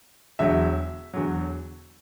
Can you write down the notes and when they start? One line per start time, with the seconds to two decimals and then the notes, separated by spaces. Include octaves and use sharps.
0.39 E1 E2 D3 F#3 E5
1.14 E1 E2 D3 F#3